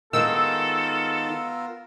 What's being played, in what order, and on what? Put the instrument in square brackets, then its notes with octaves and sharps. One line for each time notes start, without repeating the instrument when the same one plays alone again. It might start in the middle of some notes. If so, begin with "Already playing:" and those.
[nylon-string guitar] D#3 G#3 [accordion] B3 F4 A#4 [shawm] A4 [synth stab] E6